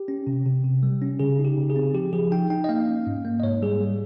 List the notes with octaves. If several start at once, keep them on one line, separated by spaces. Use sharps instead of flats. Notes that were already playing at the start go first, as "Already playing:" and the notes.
Already playing: G4
C#4
C3
C3
C3
G3
C#4
C#3 G#4
D#4
G4
C#3
G#4
C4
F3 G4
F3 G#4
D#4 G5
D#4 G5
D#5
A#3 F5
C#4
G#2
A#3
D#5
G#2 C#5
G3 G#4
G3